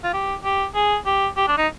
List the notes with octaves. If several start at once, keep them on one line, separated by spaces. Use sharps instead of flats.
F4
G4
G4
G#4
G4
G4
D4
D#4